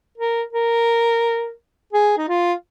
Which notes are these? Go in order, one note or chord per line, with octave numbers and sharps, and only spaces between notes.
A#4
A#4
G#4
D#4
F4